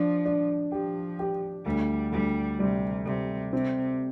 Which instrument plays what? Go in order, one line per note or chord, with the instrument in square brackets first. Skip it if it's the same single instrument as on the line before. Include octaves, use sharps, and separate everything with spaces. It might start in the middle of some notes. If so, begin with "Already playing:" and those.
Already playing: [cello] F3 [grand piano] D4
[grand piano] D4
[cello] F3 [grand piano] G4
[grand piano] G4
[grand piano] D2 [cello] G3
[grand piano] D2 [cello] G3
[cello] C3 [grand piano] G3
[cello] C3 [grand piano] G3
[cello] C3 [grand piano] C4